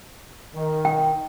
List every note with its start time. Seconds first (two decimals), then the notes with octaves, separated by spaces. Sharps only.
0.56 D#3
0.85 G5